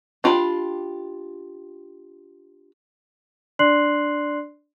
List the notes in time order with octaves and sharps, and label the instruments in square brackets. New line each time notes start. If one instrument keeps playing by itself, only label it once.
[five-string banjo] D4 F4 G4 B5
[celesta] D4 D5 C6 F#6 C7 F#7